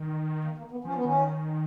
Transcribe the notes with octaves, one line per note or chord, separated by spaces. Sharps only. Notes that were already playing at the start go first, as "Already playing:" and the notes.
Already playing: D#3
A#3
A#3
B3
F3 C#4
B3
D#3 C#4